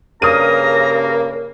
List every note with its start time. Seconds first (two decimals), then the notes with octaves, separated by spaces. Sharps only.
0.22 G2 C#3 A#3 A#4 A#5 D#6 F6 D#7